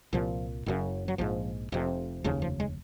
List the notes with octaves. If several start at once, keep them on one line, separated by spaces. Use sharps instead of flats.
C2 A#2 F3
F#1 F#2 C#3
F#3
A#1 G#2 F3
F1 F2 C3
F1 D#2 C#3 F3
F3
G#3